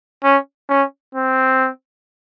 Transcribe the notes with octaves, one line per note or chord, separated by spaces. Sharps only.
C#4
C#4
C4